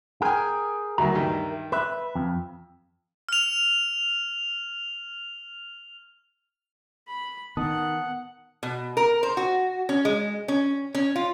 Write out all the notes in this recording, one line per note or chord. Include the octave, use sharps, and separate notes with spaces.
G#4 A#4 G5 G#5
D2 F#3 A#4 E5 A#5
G2 D#3
B4 E5
F2
F6 F7
B5
D#3 B3 F#5 A5 D#6
B2
A#4
C5
F#4
C#4
G#3
C#4
C#4
F4